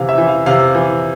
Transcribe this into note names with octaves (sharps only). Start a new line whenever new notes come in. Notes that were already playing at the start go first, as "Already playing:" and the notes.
Already playing: C3 E3 F5
E5
E3
F5
C3 F5
E3